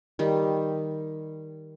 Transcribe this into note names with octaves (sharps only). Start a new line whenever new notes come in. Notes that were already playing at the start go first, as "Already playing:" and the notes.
D#3 G3